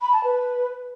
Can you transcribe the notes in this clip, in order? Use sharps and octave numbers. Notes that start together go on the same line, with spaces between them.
B5
A5
B4